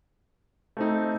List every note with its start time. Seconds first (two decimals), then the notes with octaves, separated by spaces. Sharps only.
0.77 A3 C4 D#4